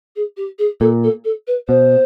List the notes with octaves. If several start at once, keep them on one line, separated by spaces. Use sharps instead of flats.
G#4
G4
G#4
A#2 A4
A4
A4
B4
B2 C5